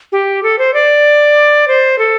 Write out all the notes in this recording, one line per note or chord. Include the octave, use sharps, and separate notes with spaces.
G4
A4
C5
D5
C5
A4